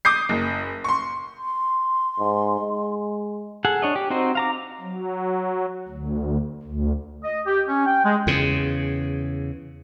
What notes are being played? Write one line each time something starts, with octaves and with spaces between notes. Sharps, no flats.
D6 D#6 G6 C7
F#1
C6 C#6
C6
G#2
G#3
G#4 A4 F#5
D4 C#5 D#5
G4
C4 D#4 F#4 C5
F5 A#5 D6
F#3
D2
D2
D#5
G4
C#4
G5
G#3
E2 C#3